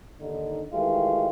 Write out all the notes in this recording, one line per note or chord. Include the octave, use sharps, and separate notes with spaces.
D#2 D3 D#4
D#3 E3 G#3 A3 F4 G4